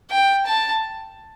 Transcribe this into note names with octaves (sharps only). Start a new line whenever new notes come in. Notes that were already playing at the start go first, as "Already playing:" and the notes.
G5
A5